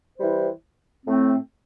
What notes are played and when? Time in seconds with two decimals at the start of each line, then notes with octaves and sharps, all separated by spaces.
0.17 E3 G3 E4 C5
1.06 A2 A3 C4